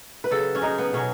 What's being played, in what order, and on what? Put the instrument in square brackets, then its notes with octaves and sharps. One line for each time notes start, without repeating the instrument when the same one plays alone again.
[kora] B4
C#3 F#3 A4
C#4
C#3 F#3 D#4
B3
B2 F#3 C#4